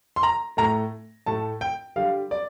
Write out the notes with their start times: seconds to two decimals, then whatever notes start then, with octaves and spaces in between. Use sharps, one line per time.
0.16 C6
0.23 A#5
0.57 A2 A3 A#5
1.26 A2 A3 A5
1.61 G5
1.96 D3 G3 F5
2.31 D5